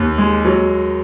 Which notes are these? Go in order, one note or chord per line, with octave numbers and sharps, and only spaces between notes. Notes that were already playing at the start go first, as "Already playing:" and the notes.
Already playing: D#2
G#3
F#3